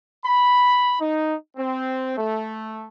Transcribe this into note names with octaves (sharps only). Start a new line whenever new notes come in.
B5
D#4
C4
A3